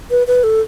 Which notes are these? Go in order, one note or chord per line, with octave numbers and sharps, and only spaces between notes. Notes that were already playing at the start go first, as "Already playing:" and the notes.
B4
B4
A4